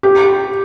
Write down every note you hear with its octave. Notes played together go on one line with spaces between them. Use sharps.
G4